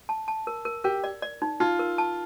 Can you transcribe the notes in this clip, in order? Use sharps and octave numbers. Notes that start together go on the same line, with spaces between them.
A5
A5
A#4
A#4
G4 A#4
D5
D5
D#4
D#4 F4
A#4
A5